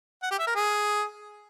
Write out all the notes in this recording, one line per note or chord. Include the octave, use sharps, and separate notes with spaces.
F#5
G4
E5
A#4
G#4